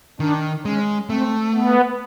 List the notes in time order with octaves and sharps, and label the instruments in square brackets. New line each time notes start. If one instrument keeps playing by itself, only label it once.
[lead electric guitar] D#3 [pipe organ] D4
[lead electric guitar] G#3 [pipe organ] C#4
[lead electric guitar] A3 [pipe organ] C4
[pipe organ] B3